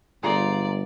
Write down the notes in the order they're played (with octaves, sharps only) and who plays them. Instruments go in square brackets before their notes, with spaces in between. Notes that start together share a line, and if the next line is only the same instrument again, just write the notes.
[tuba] G1 [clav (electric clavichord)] A3 F4 G#4 [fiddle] D5 [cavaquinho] F5 A#5 C6